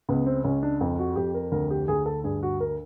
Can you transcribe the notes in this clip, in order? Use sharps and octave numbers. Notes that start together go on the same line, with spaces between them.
C#2 B3
C4
C#2 C#4
D4
F2
F#4
F2 G4
A#4
D2 A#4
G4
D2 G#4
A4
G2 G#4
F#4
A#4